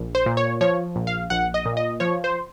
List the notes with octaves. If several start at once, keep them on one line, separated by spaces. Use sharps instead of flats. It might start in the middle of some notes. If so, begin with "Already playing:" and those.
Already playing: A#1
C5
A#2
C#5
F3 C#5
A#1
F5
A#1 F#5
D#5
A#2
D#5
F3 C#5
C5